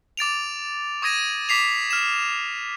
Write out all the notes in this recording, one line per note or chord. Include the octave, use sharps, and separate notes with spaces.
D6 A6 D7 F7
C#6 D#6 G#6 A#6 D#7
D6 B6 C7 F7
F6 E7